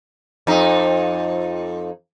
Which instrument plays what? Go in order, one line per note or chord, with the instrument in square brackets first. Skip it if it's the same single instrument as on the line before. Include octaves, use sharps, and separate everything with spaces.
[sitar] F2 D#4